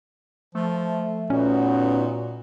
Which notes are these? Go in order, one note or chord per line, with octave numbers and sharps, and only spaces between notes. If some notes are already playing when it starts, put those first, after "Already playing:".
F3 A3
A#2 B3 C#4 D#4 F#4